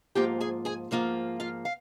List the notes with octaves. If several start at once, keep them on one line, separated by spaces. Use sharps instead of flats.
G#2 F3 A#3 F4 G4 G5
G#4 G#5
G#4 G#5
G#2 F3 A#3 F4
F4 F5
F5